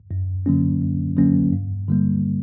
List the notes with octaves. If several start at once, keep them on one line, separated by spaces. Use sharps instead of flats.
F#2
D3 F#3 A#3 C#4
F#2
D3 F#3 A#3 C#4
G2
D3 G3 A#3